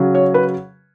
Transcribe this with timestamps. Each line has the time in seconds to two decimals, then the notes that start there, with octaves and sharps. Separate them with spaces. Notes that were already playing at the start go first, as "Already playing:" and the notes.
Already playing: C#3 F#3
0.15 C#5
0.34 B4